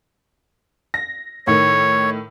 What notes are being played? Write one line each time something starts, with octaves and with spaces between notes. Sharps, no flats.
A#6
A2 D#3 C#5